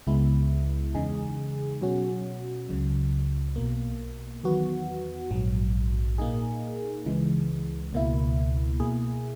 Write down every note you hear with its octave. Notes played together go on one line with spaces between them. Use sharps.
C#2 C#3 G#3 B3 E4
E2 C#3 G#3 D#4 G#4
B2 F#3 C#4 F#4
C#2 C#3 F#3
B1 B2 A#3
E2 D#3 F#3 B3 F#4
A#1 G#2 F#3
A#2 A#3 D#4 G#4
C#2 C#3 E3 G#3
C#2 B2 A#3 E4
B2 A#3 E4 G#4